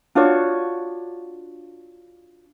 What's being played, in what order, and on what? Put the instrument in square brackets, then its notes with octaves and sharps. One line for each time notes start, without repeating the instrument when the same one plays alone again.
[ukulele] D4 F4 F#4 C#5